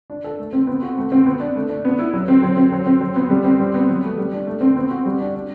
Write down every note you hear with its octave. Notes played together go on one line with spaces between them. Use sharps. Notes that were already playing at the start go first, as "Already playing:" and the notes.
D4
A4
A3
C4
B3
F#4
A3
C4
B3
D4
A3
D4
B3
E4
F#3
C4
F#3
C4
F#3
C4
F#3
B3
G3
C4
G3
B3
F#3
A3
G3
D4
A3
C4
B3
F#4
G3
D4
D4